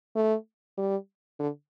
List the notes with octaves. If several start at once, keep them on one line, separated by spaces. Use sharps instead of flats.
A3
G3
D3